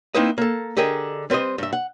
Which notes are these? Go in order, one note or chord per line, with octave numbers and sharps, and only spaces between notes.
A#3 C4 D#4 E4 B4 D#5
A#3 A4
D3 G4 G#4 A#4 D#5
G3 C4 B4 C5 D#5
G2 E5
F#5